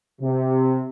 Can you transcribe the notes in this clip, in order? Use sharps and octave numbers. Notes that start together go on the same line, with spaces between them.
C3